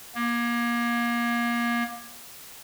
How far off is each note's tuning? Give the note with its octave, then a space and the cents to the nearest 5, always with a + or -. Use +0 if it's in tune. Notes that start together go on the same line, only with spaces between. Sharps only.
A#3 +30